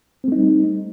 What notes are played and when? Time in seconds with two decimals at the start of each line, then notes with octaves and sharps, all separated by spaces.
0.24 C4
0.28 A3
0.32 D#4
0.36 G3